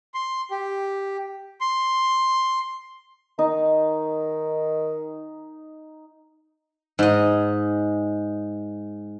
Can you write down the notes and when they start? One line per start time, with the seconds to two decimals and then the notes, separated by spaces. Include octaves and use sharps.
0.14 C6
0.51 G4
1.61 C6
3.39 D#3 D#4
6.99 G#2 D#5